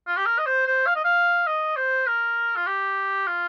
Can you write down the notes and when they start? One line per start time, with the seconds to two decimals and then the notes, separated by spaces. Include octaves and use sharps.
0.08 F4
0.17 G4
0.26 A#4
0.38 D#5
0.46 C5
0.67 C5
0.87 F5
0.96 D#5
1.04 F5
1.47 D#5
1.77 C5
2.07 A#4
2.56 F4
2.67 G4
3.27 F4